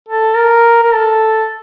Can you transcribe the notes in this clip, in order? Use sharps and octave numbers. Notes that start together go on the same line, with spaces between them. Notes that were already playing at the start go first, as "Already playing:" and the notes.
A4
A#4
A#4
A4